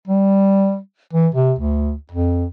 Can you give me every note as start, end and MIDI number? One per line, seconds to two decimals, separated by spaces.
0.07 0.78 55
1.13 1.28 52
1.34 1.53 48
1.59 1.93 38
2.12 2.45 41